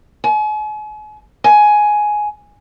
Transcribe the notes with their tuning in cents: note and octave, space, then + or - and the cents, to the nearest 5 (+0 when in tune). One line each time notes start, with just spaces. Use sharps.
G#5 +40
G#5 +10